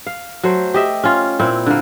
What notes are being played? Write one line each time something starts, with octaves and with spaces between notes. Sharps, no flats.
F5
F#3 A3 C5
G4 D#5 E5
C#4 F4
A#2 C4 E4
D3 A#3